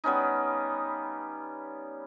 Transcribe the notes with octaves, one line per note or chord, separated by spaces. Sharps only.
G3 B3 C#4 D#4